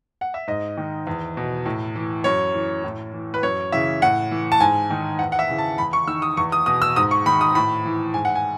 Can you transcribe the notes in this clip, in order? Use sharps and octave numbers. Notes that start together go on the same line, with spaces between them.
F#5
E5
G#2 D#5
D#3
E2
B2
A2
E3
F#2 C#5
E3
A2
E3
B4
F#2 C#5
C#3 E3 E5
A2 F#5
E3
A5
G#2 G#5
D#3
E2 F#5
F#5
E5
C#3 E3
A5
E2 B5
C#6
D#3 E6
D#6
E2 C#6
D#6
B2 D#6
E6
G#2 D#6
C#6
D#3 B5
D#6
A2 B5
E3
G#2 G#5
F#5
G#5